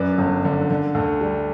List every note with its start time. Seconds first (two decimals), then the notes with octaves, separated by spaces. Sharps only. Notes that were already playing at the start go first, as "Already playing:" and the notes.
Already playing: F#2 B4 D5
0.18 G1
0.45 D3
0.70 D3
0.95 D2
1.21 G3